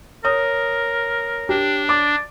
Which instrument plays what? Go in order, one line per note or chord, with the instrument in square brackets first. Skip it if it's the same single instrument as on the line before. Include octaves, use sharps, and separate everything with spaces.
[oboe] A#4 [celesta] C#5 [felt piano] D#6
[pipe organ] D4 [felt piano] G4
[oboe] D5 [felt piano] D6